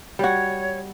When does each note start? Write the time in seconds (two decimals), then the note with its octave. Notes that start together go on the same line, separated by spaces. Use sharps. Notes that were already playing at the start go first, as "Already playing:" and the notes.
0.19 G3 F#4 C#5